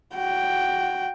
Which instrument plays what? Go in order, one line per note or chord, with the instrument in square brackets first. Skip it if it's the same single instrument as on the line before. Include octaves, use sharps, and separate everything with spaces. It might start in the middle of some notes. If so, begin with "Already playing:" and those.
[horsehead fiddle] F#4 G5